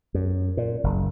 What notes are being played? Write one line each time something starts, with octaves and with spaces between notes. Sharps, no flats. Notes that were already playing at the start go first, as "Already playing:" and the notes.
F#2
A#2
F#1